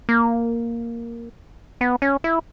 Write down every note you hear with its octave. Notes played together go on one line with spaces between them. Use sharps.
A#3
B3
C#4
E4